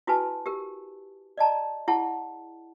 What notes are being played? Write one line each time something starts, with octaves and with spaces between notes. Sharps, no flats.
E4 F#4 G#4 B4 G#5 A5
G4 A#4
D5 D#5 A5 A#5
E4 G#4 F#5 A5